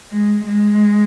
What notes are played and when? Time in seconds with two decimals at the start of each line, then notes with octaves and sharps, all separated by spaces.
0.12 G#3
0.45 G#3